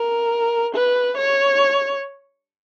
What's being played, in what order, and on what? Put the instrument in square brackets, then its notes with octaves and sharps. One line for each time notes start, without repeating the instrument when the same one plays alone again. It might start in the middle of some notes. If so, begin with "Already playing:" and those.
Already playing: [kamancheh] A#4
B4
C#5